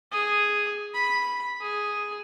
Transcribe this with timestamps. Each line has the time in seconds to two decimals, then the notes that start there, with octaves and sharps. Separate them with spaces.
0.12 G#4
0.94 B5
1.61 G#4